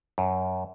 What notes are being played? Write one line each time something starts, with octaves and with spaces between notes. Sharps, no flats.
F#2